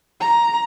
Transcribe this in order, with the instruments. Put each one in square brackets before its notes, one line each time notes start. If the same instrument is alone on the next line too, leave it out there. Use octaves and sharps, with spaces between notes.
[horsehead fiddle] A#5